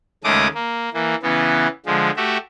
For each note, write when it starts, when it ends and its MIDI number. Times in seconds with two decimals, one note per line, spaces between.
0.24 0.47 39
0.24 0.47 49
0.24 0.47 56
0.24 0.47 57
0.24 0.47 86
0.24 0.47 87
0.54 0.89 58
0.93 1.15 52
0.93 1.15 58
1.23 1.67 49
1.23 1.67 52
1.23 1.67 59
1.86 2.11 50
1.86 2.11 53
1.86 2.11 56
2.16 2.37 57
2.16 2.37 66
2.16 2.37 67
2.16 2.37 76